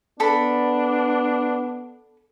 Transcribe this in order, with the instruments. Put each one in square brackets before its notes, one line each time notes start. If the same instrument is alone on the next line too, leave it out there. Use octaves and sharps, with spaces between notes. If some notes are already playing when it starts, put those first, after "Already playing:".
[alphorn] B3 [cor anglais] D4 [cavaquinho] A4 B5